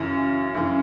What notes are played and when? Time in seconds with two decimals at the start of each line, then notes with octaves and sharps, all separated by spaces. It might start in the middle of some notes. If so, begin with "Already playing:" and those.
Already playing: F#2 C#3 E3
0.54 F#2 C#3 E3